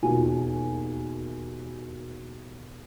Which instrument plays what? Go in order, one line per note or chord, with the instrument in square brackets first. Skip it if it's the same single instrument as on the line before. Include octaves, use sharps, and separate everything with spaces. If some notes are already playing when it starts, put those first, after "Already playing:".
[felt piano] E1 D#2 F4 F#4 G#5